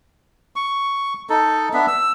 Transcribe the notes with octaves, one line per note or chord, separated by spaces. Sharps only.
C#6
D#4 A4
B3 D4 E5
E6